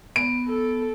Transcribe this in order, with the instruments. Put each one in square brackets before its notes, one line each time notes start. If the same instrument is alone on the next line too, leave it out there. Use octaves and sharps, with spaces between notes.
[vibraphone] B3 [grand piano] D7
[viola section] A4